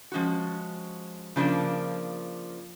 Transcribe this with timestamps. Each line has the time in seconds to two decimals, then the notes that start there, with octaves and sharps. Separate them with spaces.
0.12 F3 G#3 C#4 F#4
1.36 C#3 F3 A#3 D4